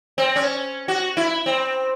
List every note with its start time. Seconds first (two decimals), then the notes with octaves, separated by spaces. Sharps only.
0.18 C4
0.36 C#4
0.88 F#4
1.17 E4
1.46 C4